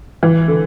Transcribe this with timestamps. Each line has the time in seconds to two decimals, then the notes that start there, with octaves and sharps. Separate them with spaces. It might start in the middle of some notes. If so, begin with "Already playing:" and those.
0.23 E3
0.48 D3